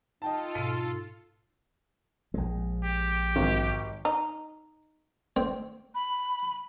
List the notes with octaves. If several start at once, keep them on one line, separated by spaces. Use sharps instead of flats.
D#4 F4 A4 D#5 G5 A5
G#2 B2 D#7
A#1 G#3
G4
G#1
D#4
C4
B5